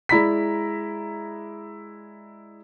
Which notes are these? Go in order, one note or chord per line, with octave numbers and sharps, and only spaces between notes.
G#3 E4 D5 A#5 B5 B6